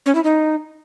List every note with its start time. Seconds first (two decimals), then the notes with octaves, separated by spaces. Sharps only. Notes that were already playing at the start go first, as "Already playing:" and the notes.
0.06 C#4
0.15 E4
0.24 D#4